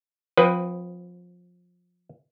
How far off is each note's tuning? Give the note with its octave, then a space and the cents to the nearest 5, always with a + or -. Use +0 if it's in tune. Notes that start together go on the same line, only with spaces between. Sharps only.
F3 +25 C4 +5 B4 +0